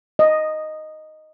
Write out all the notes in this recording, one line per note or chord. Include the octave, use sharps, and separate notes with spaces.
D#5